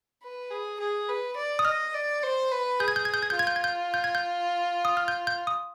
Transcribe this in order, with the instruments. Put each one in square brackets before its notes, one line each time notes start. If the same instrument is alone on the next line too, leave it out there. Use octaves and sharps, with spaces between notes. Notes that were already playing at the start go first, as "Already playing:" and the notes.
[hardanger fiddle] B4
G#4
G#4
B4
D5
[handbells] D#6
[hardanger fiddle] D#5 [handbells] F6
[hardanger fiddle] D5
C5
B4
[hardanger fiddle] G#4 [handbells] G6
[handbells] G#6
G6
G#6
G6
G#6
G6
[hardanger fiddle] F4 [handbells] G#6
[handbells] G6
G#6
G6
G6
G#6
G6
D#6
F6
G6
G6
D#6